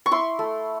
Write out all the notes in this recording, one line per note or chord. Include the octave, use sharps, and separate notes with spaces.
C#6
E4 C6
A3